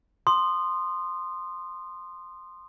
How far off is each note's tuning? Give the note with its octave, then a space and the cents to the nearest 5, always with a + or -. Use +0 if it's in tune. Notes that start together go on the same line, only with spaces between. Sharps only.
C6 +0 D#6 -20